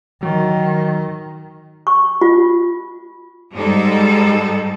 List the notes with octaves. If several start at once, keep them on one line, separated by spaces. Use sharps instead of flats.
D#3 F#3
C#6
F4
G#2 G3 G#3 D#4 A4